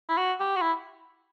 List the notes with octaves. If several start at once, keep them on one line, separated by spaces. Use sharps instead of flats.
E4
F#4
G4
F#4
E4